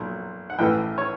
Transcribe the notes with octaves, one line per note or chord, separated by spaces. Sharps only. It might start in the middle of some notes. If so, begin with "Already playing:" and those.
Already playing: B1 A#2 F#3
F#5
A1 A2 E3 A3 G5
C#5